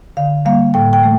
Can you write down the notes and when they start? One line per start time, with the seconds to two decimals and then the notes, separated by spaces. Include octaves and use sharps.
0.17 D3 F5
0.45 G3 A#3 F5
0.74 A2 G5
0.93 G5
1.03 E3 A3